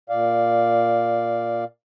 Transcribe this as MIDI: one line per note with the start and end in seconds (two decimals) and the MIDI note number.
0.09 1.64 46
0.09 1.64 74
0.09 1.64 77